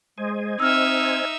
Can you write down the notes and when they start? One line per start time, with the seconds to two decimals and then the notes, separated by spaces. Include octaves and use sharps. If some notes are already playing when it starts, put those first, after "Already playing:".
0.18 G#3 C5 D#5 G#5
0.60 C4 D#4 E5 E6 F6